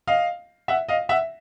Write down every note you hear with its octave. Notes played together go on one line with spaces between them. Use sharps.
D#5 F5
E5 F#5
D#5 F5
E5 F#5